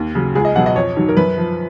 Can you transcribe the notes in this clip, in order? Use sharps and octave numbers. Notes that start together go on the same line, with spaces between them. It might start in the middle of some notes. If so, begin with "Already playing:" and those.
Already playing: D#2
C#3 F#3
C#2 G#4
D#5
B2 F#3 F#5
D#5
F2 C#5
D#3 F#3
A#4
F#2 B4
F3